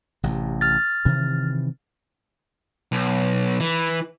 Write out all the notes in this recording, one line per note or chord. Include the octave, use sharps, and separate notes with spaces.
A1 C3
F6 A6
C3 D#3 E3
B1
E3